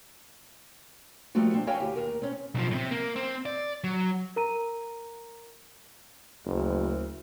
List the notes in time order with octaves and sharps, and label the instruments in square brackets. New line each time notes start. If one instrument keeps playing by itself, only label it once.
[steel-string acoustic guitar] F3 G3 A3 A#3 F4 F#4
C4 D4
E4 F#4 C#5 F5 G5 G#5
D2 G4
D#2 A#4
C4 C#4
[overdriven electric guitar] B1 F3
A2 C3
A#3
C4
D5
F#3
[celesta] A#4 A#5 D#7
[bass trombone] F#1 [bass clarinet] D2